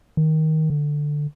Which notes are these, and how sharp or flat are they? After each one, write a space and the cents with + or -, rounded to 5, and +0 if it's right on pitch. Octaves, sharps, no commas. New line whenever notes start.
D#3 +15
D3 +10